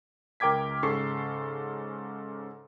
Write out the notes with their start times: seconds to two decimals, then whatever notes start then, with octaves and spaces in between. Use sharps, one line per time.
0.40 C#2 A#4 G5 D6 G#6 B6
0.83 G#2 C#3 A4 C#6 C7